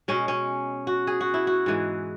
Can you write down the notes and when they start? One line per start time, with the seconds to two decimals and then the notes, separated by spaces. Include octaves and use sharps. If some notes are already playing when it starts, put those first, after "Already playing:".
0.08 B2 G#3 C#4
0.28 C#4
0.87 F#4
1.07 G#4
1.21 F#4
1.34 E4
1.47 F#4
1.66 G#2 E3 G#3